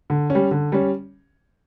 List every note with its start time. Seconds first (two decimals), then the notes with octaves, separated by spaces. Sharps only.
0.10 D3
0.30 G3 C#4
0.51 D3
0.72 G3 C#4